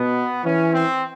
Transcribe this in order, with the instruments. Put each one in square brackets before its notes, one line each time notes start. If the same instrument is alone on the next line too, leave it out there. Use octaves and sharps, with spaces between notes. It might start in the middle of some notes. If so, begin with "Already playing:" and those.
Already playing: [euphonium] B2 [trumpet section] B3
[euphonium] E3 [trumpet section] C#4
[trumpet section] C4